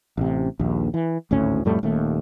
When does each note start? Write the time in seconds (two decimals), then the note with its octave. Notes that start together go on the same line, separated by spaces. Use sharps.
0.17 A1 C3
0.59 A#1 D#2
0.94 E3
1.31 G#1 D2 A2 C#4
1.65 F2 A2 G3 A3
1.83 D#1 D#2 A3